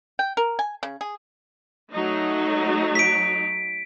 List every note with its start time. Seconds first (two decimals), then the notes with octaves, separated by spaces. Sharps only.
0.19 G5
0.37 A#4
0.59 G#5
0.83 C#3
1.01 G#4
1.93 F#3 A3 D#4
2.95 B6 D7